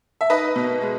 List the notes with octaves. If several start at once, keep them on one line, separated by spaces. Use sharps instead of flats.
E5
D#4 B4 D#5
B2
G#3